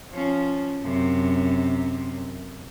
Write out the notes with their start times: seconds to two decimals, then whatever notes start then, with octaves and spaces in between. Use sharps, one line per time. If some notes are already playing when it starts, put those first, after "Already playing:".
0.13 F3 C#4
0.82 F#2 C3